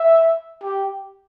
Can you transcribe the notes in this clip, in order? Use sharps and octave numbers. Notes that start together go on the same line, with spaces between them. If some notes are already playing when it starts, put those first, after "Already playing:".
Already playing: E5
G4